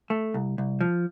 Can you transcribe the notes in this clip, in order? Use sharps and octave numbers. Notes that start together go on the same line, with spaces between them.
A3
C2
C2
F3